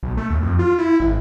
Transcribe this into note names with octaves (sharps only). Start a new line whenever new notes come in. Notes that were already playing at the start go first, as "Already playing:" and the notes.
B1
A3
D#2
F2
F4
E4
G#1